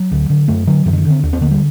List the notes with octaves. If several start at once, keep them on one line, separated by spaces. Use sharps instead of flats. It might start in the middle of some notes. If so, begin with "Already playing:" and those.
Already playing: F#3
D2
D3
F#2 A3
D3 F#3
F#2 D#3
D3
D#3
D3
C4
D#2 D4
C4
D3 A#3
G3